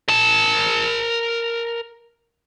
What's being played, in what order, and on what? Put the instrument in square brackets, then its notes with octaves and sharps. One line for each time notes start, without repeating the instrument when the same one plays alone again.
[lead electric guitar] A#4 A5